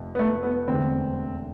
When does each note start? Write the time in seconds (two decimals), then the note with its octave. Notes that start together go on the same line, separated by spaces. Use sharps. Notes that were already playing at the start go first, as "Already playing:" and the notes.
Already playing: F1 F2 C3
0.15 B3
0.19 A3
0.43 B3
0.67 E1 D2 D3 C4